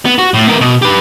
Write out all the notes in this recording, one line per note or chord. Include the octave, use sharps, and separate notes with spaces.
B3
F#4
A2
B3 A#4
B2
G4 B4